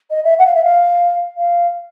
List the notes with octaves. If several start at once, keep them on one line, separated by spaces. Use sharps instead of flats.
D#5
E5
F#5
F5
E5
F5
F5